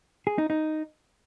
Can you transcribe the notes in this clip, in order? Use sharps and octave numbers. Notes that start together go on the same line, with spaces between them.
G#4
D#4
D#4